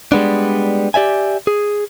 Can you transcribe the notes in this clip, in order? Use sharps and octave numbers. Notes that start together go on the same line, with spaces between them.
G3 G#3 B3 D4
G4 D5 E5 G#5
G#4